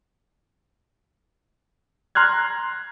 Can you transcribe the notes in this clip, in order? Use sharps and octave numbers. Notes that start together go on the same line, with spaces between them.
A#5 C6 F6 F#6 G#6